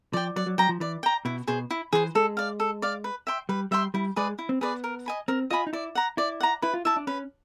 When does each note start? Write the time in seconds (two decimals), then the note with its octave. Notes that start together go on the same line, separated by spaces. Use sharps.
0.13 F3 D5 G5
0.36 F#3 D5
0.47 F#3
0.58 F#3 G5 A#5
0.69 F3
0.80 E3 D5
1.03 G5 A#5
1.25 B2 E4
1.47 B2 G#4 C5
1.71 E4
1.93 E3 G#4 C5
2.15 G#3 A4
2.37 D5 F5
2.60 A4
2.82 D5 F5
3.04 B4
3.27 E5 G5 C6
3.49 G3 B4
3.71 G3 E5 G5 C6
3.94 G3 E4
4.16 G#3 G#4 B4 D5
4.39 E4
4.49 C4
4.61 B3 G#4 B4 D5
4.84 A#4
5.06 D#5 G#5 B5
5.28 C4 A#4
5.50 F4 D#5 G#5 B5
5.67 D#4
5.73 E4 D5
5.95 F#5 A#5
6.17 E4 D5
6.40 F#5 A#5
6.62 E4 B4
6.74 F4
6.85 E4 E5 A5
6.96 D4
7.07 C#4 B4